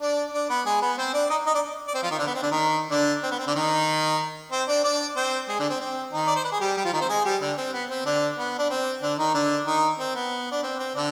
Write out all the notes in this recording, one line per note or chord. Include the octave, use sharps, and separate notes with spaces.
D4 D5
D4 D5
B3 B4
G#3 G#4
B3 B4
C4 C5
D4 D5
D#4 D#5
D#4 D#5
D4 D5
D5
C4 C5
F3 F4
D#3 D#4
D3 D4
B3
C4
D3 D4
D#3 D#4
D3 D4
C4
B3
C4
D3 D4
D#3 D#4
C4 C5
D4 D5
D4 D5
C4 C5
G#3 G#4
D3 D4
C4
C4
D#3 D#4
D5
C5
B4
G#4
G3 G4
G3 G4
F3 F4
D#3 D#4
C4 C5
G#3 G#4
G3 G4
D3 D4
C4
B3
C4
D3 D4
B3
D4
C4
D3 D4
D#3 D#4
D3 D4
D#3 D#4
C4
B3
D4
C4
C4
D3 D4